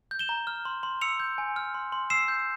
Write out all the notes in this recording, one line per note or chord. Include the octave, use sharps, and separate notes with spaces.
G6
E7 G7
A#5
F6
C6
C6
E6 C#7 F7
G6
G#5
F6
C6
C6
E6 C7 E7
G6